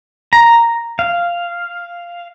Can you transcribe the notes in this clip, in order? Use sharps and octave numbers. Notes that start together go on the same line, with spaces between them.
A#5
F5